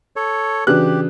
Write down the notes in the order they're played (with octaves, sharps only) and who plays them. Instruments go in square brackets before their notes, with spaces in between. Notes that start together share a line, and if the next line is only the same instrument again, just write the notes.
[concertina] A4 C#5
[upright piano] C#3 D4 F#6 [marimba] E3 F#4 B4 [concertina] G4